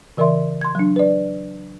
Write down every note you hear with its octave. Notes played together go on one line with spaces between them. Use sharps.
C#3 E3 A#4 D5 E5 C6
C6 G#6
F#3 D4
B4 D5